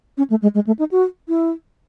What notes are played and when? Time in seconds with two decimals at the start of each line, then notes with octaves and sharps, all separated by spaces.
0.18 C#4
0.30 A3
0.42 G#3
0.55 G#3
0.67 A3
0.79 D#4
0.91 F#4
1.28 E4